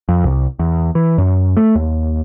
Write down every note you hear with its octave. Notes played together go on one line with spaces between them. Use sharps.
F2
C2
E2
E3
F#2
A3
D#2